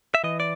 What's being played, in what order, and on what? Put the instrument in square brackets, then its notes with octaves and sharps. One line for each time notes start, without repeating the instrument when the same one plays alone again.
[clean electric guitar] E5
E3 D#5
D5